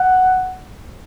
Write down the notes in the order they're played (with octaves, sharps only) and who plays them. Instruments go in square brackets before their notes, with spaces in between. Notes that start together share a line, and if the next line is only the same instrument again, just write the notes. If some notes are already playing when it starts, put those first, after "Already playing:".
Already playing: [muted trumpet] F#5